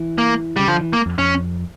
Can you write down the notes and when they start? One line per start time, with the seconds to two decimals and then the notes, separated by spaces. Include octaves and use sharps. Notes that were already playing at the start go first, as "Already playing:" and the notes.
Already playing: E3
0.18 A#3
0.56 C#3 G3
0.68 D3 F3
0.81 E3
0.93 A#3
1.06 F2
1.18 F2 C#4